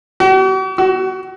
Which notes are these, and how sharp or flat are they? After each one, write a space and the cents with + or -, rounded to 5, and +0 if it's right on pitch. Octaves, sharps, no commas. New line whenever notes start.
F#4 +45
F#4 +25